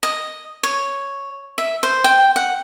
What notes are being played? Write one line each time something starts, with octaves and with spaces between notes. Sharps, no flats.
D#5
C#5
E5
C5
G5
F#5